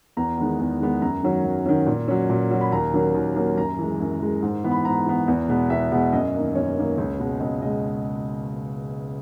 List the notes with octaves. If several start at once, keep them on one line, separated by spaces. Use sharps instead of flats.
E2 A#5
D#3 G#3 B3
E2
D#3 G#3 B3
F#2 A#5
D#3 F#3 C#4
F#2
D#3 F#3 C#4
A#2
F#3 C#4
A#2
F#3 C#4
B5
D#2 A#5
D#3 F#3 A#3 C#4
D#2
D#3 F#3 A#3 C#4
F#2 A#5
E3 G#3
F#2
E3 G#3
G#2
E3 B3
B5
G#2 A#5
E3 B3
E2
B2 G#3 B3
E2 E5
B2 G#3 B3
F#2 D#5
D#3 A#3
F#2 C#5
D#3 A#3
C#2
B2 G#3
C#2 D#5
B2 G#3 D#5